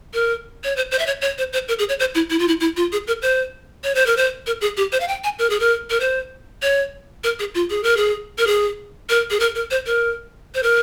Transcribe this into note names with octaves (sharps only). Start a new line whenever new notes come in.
A#4
C#5
C5
C5
E5
C#5
C#5
C5
C5
A#4
G#4
C#5
C5
E4
E4
F4
E4
E4
F4
G#4
A#4
C5
C#5
C5
A#4
C5
A#4
G#4
G4
C5
F5
G5
G#5
A#4
G#4
A#4
A#4
C5
C#5
A#4
G#4
F4
G#4
A#4
G#4
A#4
G#4
A#4
G#4
A#4
A#4
C5
A#4
C5
A#4